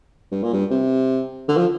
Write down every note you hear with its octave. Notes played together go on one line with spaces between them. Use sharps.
G2
A#2
G2
C3
D3
F3